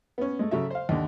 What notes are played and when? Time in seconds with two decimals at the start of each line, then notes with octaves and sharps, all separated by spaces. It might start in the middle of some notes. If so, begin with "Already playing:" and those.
0.18 B3 C#4
0.39 G#3 A3
0.51 C#3 F#3 A4 E5
0.70 C5 F5
0.89 D#2 D3